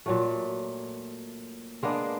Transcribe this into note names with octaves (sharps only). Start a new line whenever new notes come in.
A#2 F#3 A3
G#3 A#3 B3 D4